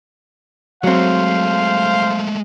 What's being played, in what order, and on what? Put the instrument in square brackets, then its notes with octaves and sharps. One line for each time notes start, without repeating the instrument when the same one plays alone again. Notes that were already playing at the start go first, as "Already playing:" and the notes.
[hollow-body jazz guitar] F#3 C4 [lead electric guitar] G#3 A3 [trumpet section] C5 F5